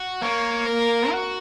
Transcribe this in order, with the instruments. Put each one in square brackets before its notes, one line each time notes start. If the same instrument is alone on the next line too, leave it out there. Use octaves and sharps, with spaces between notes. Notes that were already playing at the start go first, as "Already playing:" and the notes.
Already playing: [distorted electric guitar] F#4
[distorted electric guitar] A#3 [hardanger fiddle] C#5
[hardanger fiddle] A#4
[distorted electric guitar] F#4